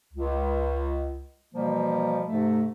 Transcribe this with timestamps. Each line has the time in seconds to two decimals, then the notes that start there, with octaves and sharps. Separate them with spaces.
0.14 C#2
1.54 B2 E3 F3 G3 A#3
2.28 G#2 C3 A3